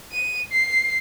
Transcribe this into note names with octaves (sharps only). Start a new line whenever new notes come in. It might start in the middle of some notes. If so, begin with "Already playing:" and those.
D#7
C7